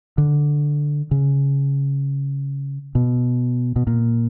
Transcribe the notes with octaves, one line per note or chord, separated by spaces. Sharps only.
D3
C#3
B2
B2
A#2